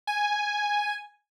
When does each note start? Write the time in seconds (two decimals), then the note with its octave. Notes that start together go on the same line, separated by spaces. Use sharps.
0.07 G#5